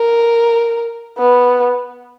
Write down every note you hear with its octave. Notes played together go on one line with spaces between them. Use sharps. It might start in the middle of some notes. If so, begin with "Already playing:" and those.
Already playing: A#4
B3